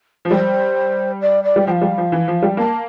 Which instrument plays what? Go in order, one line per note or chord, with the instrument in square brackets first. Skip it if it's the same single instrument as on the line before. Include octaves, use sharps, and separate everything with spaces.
[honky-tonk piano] F3
[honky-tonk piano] G3 [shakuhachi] C5
[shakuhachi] D5
D5
[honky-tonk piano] G3
[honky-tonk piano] F3 [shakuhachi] F5 G5
[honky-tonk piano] G3
F3
E3
F3
G3
[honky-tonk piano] A#3 [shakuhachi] A5